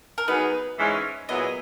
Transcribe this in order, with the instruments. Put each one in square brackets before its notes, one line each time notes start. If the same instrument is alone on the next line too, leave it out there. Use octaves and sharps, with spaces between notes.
[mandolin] A#4
[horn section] F#3 B3 D#4 G#4 [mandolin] B4
[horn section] G#2 E3 G#3 C#4
[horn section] A#2 F#3 B3 E4 G#4 [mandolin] D#5